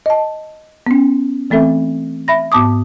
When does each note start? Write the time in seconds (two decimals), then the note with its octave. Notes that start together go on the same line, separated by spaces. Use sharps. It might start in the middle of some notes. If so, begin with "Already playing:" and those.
0.06 D#5 A5
0.87 B3 C#4
1.50 E3 A3 C4 A4 E5
2.28 E5 B5 A#6
2.52 G#2 B3 A5 D6 D#6